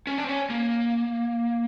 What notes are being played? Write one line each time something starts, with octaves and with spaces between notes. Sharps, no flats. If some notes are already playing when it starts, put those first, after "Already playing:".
C#4
D4
C4
C#4
A#3